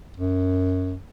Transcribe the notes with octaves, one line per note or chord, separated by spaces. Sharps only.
F#2